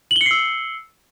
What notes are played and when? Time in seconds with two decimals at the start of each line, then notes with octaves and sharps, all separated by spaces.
0.11 F#7
0.16 G7
0.21 C#7
0.26 C7
0.31 E6